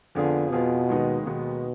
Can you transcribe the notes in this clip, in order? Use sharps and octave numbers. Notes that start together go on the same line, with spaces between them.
F2 D3 F3 B3 F4 G#4
F2 B2 F3 B3 F4 G#4
D#2 D#3 G#3 B3 D#4
D#2 B2 D#3 G#3 B3 D#4